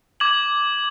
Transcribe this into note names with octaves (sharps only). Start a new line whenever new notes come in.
D6 G#6 F#7